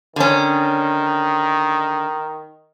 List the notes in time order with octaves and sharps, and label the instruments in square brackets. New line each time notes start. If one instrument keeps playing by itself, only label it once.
[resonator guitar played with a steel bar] D3 C#4 [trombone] D#3